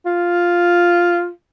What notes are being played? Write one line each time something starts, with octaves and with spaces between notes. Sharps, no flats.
F4